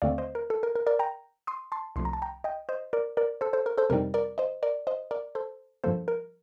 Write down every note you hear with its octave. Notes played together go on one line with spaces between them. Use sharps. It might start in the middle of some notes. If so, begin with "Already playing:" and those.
D#2 D3 A3 C4 D5 F5
C5 D#5
A#4
A4
A#4
A#4
A#4 D5
G5 A#5
C6 D#6
A5 C6
C2 C3 F3 A3 C6
A#5
A5
G5 A#5
D#5 G5
C5 D#5
A#4 D5
A#4 D5
A4 C5
A4 C5
A#4
A4 C5
F2 C3 G3 C4 D#4 A#4
A#4 D5
C5 D#5
A#4 D5
C5 D#5
A#4 D5
A4 C5
G2 F3 A#3 A4 C5
A#4